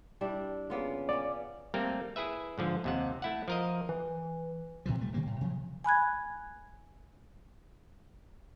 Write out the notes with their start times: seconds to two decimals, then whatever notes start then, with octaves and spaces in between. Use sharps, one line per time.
0.21 G3 D4 E4
0.70 C#3 A#3 B3 F4
1.09 B3 C#4 D5
1.74 G3 A3 A#3 C4 A#4
2.16 E4 G#4 B4 E5
2.58 G#2 D3 F3
2.84 D#2 C3 F#5
3.22 A3 E4 F#5
3.48 F3 A#4 D#5
3.89 E3
4.86 A2 C3 E3 F3
4.98 E1 G3 A3
5.14 C3 D#3 G3 A#3
5.26 A2
5.41 C3 F3 F#3
5.84 G#5 B5 F#6 G#6